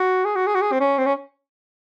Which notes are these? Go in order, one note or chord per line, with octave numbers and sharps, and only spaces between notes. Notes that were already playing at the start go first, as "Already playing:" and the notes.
Already playing: F#4
G#4
F#4
G#4
F#4
G#4
C4
C#4
C4
C#4